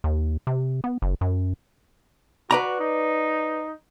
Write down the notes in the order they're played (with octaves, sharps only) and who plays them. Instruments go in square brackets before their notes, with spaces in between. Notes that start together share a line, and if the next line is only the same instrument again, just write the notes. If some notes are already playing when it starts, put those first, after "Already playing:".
[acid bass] D#2
C3
B3
F#1
F#2
[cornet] F#4 [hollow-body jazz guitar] B4 D5 A#5
[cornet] D#4